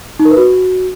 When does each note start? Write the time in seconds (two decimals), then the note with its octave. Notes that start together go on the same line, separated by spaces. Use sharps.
0.19 D#4
0.25 A#4
0.31 B4
0.37 F#4